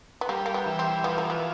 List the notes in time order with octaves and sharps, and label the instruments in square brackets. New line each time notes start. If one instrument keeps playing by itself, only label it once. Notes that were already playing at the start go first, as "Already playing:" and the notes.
[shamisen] B3
[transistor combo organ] G3 [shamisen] A#3
[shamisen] A#3
B3
[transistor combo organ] E3
[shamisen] C4
[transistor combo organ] F3 [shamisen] B3
[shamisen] A#3
B3